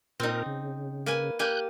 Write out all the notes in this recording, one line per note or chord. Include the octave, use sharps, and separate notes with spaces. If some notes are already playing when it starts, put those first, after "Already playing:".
A#2 C4 D#4 A#4
C#3
A#3 B4 G#5
A#3 G4 G#5 F#6 G6